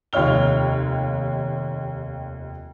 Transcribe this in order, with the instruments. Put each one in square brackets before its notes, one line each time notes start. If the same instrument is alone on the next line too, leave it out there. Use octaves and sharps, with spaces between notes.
[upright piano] F1 D#2 F4 C#5 F6 G7